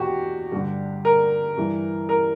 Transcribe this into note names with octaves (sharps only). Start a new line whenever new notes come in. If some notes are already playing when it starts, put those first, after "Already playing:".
Already playing: E2 B2 F#4 G4
G2 D3
A#4
G2 E3
A#4